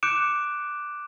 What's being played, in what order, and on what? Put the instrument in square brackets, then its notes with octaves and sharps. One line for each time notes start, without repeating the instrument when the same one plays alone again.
[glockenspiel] D6 F#6 G6 C#7 D7 E7